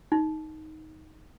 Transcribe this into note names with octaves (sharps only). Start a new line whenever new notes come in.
D#4